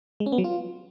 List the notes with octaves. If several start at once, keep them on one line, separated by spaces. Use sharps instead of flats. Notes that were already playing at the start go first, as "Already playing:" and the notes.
G#3
C#4
B3
F#3
F4